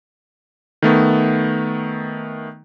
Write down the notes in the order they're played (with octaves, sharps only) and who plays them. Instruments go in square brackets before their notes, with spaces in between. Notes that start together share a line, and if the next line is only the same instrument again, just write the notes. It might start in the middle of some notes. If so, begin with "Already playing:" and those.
[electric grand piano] D#3 A3 B3